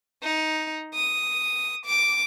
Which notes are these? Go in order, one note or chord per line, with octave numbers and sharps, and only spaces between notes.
D#4
D#6
D6